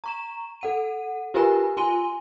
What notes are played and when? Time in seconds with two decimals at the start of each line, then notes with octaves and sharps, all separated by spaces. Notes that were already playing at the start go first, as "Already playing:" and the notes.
0.04 A#5 C#6 E7
0.61 A4 F#5 D#7
1.34 F4 G4 A#4 B4 G#5 B5
1.77 F4 G#5 C6 D#7 G7